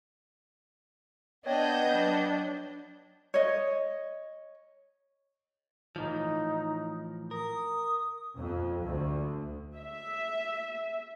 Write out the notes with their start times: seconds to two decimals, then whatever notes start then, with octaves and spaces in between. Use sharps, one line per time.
1.46 B3 D4 C#5 D#5 G5 G6 G#6
1.87 F#3 D4
3.34 C#5 D#5
5.96 A2 E3 F3 D#4
7.31 A#4 D#6
8.38 F2
8.84 D2
9.77 E5